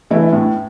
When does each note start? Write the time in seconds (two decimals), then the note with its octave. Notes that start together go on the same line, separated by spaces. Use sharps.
0.10 E3 A3 E4
0.33 A2